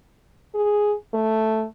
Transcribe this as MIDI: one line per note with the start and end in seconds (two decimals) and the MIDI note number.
0.55 0.94 68
1.14 1.66 57